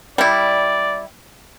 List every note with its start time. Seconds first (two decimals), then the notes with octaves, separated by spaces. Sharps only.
0.18 G3 E4 D5